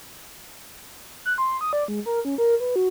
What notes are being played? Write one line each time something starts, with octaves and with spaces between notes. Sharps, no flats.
F#6
C6
D#6
D5
G#3
A#4
C#4
A#4
B4
F#4